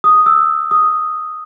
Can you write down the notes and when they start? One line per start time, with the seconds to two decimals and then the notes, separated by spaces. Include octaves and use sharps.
0.04 D#6
0.26 E6
0.71 D#6